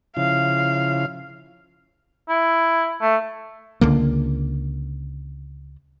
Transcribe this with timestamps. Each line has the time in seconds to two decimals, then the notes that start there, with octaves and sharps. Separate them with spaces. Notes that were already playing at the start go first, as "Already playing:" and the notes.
0.17 C#3 F3 E4 F5
2.29 E4
3.01 A3
3.81 C#2 D3 A#3